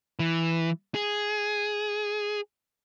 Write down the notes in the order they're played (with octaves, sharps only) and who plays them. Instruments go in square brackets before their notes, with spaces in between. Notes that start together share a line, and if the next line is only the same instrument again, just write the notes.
[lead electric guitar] E3
G#4